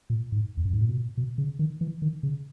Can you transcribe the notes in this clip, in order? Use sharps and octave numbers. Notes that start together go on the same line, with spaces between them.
A#2
G#2
E2
F#2
G#2
A#2
B2
B2
C#3
D#3
E3
D#3
C#3